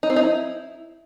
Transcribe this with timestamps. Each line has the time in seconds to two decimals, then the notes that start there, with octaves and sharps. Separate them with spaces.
0.03 D#4
0.10 C4
0.16 D#4
0.23 E4